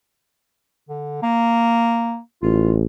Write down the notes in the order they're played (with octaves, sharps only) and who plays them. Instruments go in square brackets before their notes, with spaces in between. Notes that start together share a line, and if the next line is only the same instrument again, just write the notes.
[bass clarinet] D3
A#3
[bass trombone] A1 [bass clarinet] F4